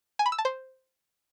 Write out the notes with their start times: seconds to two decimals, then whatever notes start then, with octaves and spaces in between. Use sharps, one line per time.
0.19 G#5
0.26 B5
0.32 E6
0.38 A5
0.45 C5